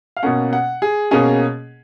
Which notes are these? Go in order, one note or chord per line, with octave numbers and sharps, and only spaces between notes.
F5
B2 A#3 C#4 F#5
F#5
G#4
B2 A#3 C#4 G#4